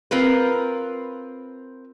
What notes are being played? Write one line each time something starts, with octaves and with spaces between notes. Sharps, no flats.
C4 F4 A#4 B4